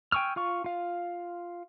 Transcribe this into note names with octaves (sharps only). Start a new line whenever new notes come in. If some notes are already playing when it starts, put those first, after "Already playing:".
G5 G#5 C#6 E6 F6
F4 F5 C#6
F4 F5